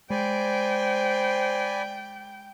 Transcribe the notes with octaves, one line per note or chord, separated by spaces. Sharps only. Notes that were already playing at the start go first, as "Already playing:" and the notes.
G#3 C5 D5 G5 G#5 B5